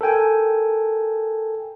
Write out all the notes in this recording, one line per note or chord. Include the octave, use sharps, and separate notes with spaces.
A4 A#4 G5 G#5